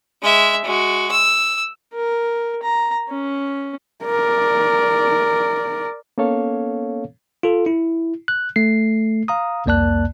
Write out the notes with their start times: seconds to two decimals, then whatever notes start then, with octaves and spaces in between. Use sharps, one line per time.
0.23 G#3 E5
0.64 G#3 F#4
1.11 E6
1.93 A#4
2.63 A#5
3.09 C#4
4.06 A#4 D5
6.18 A#3 B3 C#4 A4 C#5 F5
7.43 F4 A4
7.66 E4
8.28 F#6
8.56 A3 C7
9.28 F5 A#5 D#6
9.66 C2 F2 A#3 D5 A5 F#6